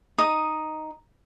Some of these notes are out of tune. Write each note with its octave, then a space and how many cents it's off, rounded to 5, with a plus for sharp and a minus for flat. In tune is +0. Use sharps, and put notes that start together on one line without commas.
D#4 +0 D#6 +0